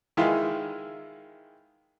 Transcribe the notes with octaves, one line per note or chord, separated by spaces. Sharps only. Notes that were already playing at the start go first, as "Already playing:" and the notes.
D#3 E3 G#3 E4 F4